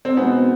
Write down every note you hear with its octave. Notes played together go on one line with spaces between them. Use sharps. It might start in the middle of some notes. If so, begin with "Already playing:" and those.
C4
B2 G#3 B3 C4 D#4 G#4